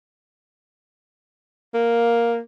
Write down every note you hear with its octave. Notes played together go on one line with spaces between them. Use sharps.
A#3